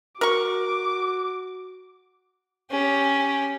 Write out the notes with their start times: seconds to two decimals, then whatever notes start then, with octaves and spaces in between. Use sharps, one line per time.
0.21 F#4 A#4 C#6 D6
2.71 C#4 G4